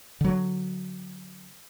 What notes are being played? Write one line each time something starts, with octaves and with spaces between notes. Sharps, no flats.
D3 F#3